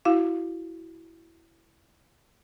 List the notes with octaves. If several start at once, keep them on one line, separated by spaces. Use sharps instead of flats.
E4 F#4 F5